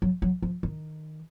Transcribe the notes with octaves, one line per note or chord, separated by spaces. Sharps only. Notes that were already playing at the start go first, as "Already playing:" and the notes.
F#3
F#3
F3
D#3